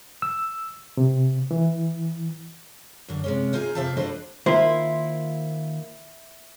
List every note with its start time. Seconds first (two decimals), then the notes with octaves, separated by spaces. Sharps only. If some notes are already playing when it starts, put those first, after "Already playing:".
0.22 E6
0.97 C3
1.51 E3
3.08 F#2 D3
3.24 C3 G#3 C#4
3.53 D#4 F4 G#4 D5 G#5
3.75 F2 C3 C4 E5 F5 A5
3.97 D4 F#4 A4 B4 C5 D#5
4.46 D#3 A#3 E4 F4 C5